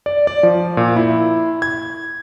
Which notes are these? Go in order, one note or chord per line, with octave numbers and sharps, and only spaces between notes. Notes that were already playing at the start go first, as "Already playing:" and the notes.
D5
D5
F3
A#2
E4
G#6